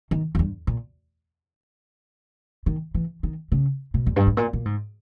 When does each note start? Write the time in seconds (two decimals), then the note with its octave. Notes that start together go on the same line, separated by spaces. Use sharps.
0.11 D#3
0.35 E2
0.39 G2
0.67 A#2
2.66 D#3
2.94 E3
3.23 D#3
3.52 C#3
3.94 B2
4.06 E2
4.16 G2
4.27 G#2
4.37 A#2
4.53 A#2
4.65 G#2